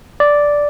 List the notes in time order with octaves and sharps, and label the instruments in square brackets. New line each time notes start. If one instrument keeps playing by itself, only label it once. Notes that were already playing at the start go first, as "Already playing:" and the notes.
[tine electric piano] D5